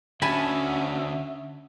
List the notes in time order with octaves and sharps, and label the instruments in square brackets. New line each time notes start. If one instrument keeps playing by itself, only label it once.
[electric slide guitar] D3 F#4 [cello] C#4 [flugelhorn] E5 [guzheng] G#5 A5 B5